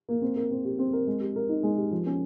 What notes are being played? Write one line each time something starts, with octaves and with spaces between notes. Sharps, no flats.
A#3
C4
A#4
C4
G4
C4
A#4
G#3
G4
A#4
D#4
G#3
G4
F3
C#4